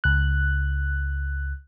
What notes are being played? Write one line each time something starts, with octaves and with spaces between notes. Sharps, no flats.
C#2 F#6